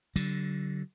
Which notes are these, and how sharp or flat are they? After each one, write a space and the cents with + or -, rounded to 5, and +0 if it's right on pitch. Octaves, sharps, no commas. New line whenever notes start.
D3 -15 F#3 +30